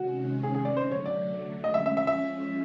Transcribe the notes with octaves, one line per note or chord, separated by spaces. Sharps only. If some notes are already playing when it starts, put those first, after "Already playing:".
Already playing: C3 D#3 G#3 C#4 F#4
G#4
G#4
D5
D3 F#3 A3 C5
C#5
D5
F3 G#3 C#4 D#5
E5
E5
E5
E5